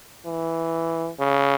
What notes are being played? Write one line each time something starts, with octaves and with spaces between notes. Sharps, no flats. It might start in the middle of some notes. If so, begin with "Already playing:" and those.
E3
C#3